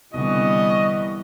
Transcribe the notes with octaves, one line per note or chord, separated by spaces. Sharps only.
C2 D3 E3 G3 B3 D#5 C#6